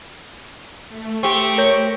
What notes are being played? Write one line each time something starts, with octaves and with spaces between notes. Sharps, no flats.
A3
C4 G4 C#6
A#4 C#5 G6